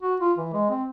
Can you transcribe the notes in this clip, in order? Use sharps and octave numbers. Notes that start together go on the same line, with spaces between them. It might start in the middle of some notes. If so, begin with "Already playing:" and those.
F#4
F4
E3
G#3
C4